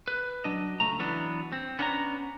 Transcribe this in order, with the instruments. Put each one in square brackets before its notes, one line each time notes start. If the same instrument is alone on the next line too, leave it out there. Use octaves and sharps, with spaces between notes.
[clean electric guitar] B4
F#3 D4 D#5
C#2 A3 A#5
E3 F#3 B3 D4
C4
B3 C#4 D4 C#5 G5 A#5